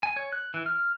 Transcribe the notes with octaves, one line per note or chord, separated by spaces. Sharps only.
G#5
C#5
F#6
E3
F6